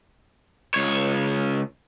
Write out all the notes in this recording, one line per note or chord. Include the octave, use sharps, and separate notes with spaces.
C#2 C#5